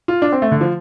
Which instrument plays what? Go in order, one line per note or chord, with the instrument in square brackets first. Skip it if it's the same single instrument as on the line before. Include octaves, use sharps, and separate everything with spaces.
[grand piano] F4
D4
C4
A3
D3
F3